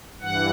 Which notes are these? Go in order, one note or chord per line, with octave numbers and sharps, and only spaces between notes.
G2 E3 F#5